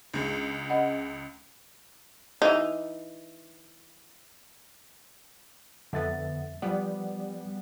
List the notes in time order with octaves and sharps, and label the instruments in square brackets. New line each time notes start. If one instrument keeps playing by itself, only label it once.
[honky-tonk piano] C#2 G#3 [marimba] D4
[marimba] C#4 D#5 F#5
[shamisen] E3 D#4
[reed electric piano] F2 E5 A6 [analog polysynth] D3 B3
[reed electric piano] F3 D5 [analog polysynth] G3 B3